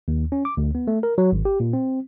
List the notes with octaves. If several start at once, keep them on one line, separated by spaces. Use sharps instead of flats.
D#2
C#4
D6
D2
B3
A3
A#4
F#3
G#1
G4
A#2
C4